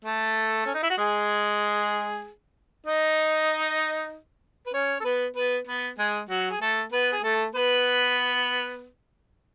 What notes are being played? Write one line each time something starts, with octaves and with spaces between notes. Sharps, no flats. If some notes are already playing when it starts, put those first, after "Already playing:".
A3 A4
C#4
D#4
E4
F#4
G#3 G#4
D#4 D#5
B4
C#4 C#5
A4
B3 B4
B3 B4
B3 B4
G#3 G#4
F#3 F#4
G#4
A3 A4
B3 B4
G#4
A3 A4
B3 B4